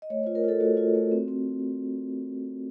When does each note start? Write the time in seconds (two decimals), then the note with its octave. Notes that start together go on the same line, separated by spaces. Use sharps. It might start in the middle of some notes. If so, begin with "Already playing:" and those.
0.02 D#5
0.10 A3 C#5
0.23 F4 C5
0.35 A#4
0.44 F4 A4
0.60 A3 F#4
0.77 F4
0.95 A3
1.12 C4
1.28 C4